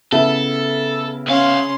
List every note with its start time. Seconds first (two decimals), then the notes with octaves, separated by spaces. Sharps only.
0.12 C#3 B3 E4 A4 E5
1.27 C2 C#4 F5 C6